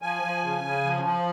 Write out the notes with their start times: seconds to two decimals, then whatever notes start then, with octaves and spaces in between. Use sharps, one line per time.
0.02 F3 G#5
0.23 F3
0.44 C#3
0.64 C#3
0.85 F3
1.05 F3